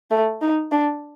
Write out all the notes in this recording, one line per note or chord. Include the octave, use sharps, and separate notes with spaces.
A3
D#4
D4